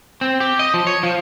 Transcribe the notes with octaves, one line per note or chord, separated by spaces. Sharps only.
C4
G4
D#5
F3
C#5
F3